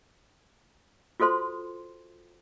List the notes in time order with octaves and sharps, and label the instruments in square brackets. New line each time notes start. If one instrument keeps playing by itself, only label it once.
[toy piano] F4 F#4 A4 C5 C6